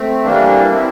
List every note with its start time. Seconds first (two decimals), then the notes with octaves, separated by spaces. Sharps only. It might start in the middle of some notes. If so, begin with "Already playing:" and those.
Already playing: A3 C4
0.24 E3 G3 A#3 D4
0.71 C4 E4